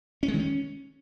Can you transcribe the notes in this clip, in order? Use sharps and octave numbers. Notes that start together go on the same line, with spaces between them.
C#4
G#3
D#3
C#4